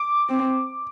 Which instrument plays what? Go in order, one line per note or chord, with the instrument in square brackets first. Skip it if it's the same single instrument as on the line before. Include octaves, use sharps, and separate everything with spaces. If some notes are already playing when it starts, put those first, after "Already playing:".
Already playing: [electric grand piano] D6
[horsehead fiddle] C4